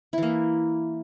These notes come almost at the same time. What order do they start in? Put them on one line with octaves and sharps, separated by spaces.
E4 E3 A#3